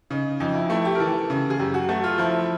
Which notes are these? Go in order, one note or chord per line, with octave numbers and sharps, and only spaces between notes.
C#3 D#4
F2 D#4
E4
A3 E4
G4
A#4
E3 A4
C#3
G#4
F#2 G4
F#4
A3 F#4
F4
F3 E4